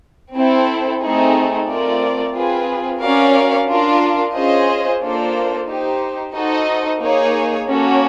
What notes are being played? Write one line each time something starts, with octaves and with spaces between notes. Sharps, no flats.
C4 E4 A4
A3 C4 D#4 G#4
A3 C4 F4 A#4 D5
C4 F4 G#4 B4
C#4 F#4 A#4 D5 F5
D4 F4 A#4
C#4 F4 G#4 C5 D#5
A#3 D4 F4 A4 C5
D#4 G4 C5
D#4 F#4 A4 C5 D#5
A#3 D#4 G#4 C#5
A#3 C#4 F#4 A4